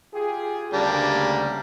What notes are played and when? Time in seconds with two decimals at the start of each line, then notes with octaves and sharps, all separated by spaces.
0.14 F4 G4 G#4
0.73 D2 C#3 G3 A#3 D4